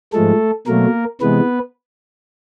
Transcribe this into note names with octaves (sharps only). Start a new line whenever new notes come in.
G#2 F3 G#3 A3 A4
B2 F#3 A3 A#3 A#4
C3 E3 G#3 B3 B4